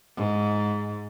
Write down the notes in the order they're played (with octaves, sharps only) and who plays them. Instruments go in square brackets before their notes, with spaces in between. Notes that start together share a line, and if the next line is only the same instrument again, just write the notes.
[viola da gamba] G#2